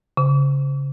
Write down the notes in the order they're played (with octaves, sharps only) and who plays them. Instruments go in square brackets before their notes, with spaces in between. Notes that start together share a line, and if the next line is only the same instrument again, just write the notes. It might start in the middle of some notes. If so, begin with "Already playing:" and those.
[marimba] C#3